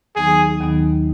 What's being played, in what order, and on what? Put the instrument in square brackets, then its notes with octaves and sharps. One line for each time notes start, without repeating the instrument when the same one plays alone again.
[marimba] D#2 D#3 F#3 B3 D#4 [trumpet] G#4
[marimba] D#2 D#3 F#3 B3 D#4